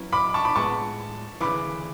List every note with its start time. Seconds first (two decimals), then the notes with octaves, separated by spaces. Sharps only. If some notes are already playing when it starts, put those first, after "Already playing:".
Already playing: F#3 C#4 E4 B4
0.13 B5 D6
0.34 A5 C#6
0.45 B5 D6
0.55 A2 G#3 B3 A5 C#6
1.41 D2 C#3 E3 B5 D6